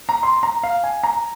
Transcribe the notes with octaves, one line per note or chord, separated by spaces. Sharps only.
A#5
C6
A#5
F5
G#5
A#5